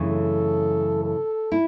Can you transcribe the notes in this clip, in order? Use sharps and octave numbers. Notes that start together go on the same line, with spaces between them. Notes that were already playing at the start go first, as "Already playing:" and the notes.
Already playing: F#2 C#3 E3 A3 D4
A4
A4
E4